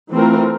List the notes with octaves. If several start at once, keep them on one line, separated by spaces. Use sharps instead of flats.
E3 A3 C4 F4 A#4